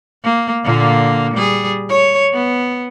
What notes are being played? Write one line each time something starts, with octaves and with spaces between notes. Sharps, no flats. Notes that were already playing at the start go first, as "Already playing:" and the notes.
A#3
A#2 D3 A#3
G3 G#4
C#5
B3